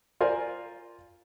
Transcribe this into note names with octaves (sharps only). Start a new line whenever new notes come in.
F4 A#4 C5 D5 G#5